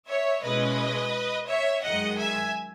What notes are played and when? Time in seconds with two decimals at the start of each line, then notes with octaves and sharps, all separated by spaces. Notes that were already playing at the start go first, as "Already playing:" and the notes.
0.09 C#5 E5
0.44 B2 G#3 C#4 E4 B4 D#5
1.48 C#5 E5
1.83 F#2 D#3 G#3 D#5 F#5
2.18 E5 G#5